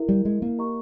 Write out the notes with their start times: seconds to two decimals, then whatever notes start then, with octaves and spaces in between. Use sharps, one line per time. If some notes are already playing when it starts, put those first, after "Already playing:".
Already playing: E4 A#4 E5
0.09 G3
0.25 G#3
0.42 A#3
0.58 G4 A#4 D#5 A#5 C#6